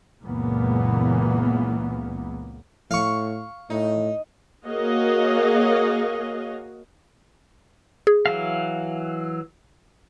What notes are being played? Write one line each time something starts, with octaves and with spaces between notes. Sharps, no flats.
C#2 F#2 A#2 E3 A#3 B3
A2 F5 C#6
A2 D#4
A#3 F#4 G#4 C#5 D#5 F5
G#4
E3 F#3 F5